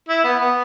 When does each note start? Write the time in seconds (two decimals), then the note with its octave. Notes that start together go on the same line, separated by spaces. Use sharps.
0.09 E4
0.24 B3
0.40 B3